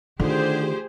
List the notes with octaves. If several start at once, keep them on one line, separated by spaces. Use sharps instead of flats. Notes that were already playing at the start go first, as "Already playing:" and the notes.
D3 D#3 A3 F4 G4 G#4 C5